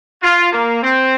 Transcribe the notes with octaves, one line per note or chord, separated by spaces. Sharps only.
F4
A#3
C4